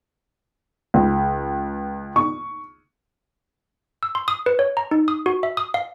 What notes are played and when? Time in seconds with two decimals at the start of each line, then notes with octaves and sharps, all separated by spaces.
0.94 C#2
2.16 C#6
4.03 E6
4.15 C6
4.28 D#6
4.46 B4
4.59 C#5
4.77 A#5
4.91 D#4
5.08 D#6
5.26 F#4
5.43 E5
5.57 D#6
5.74 F5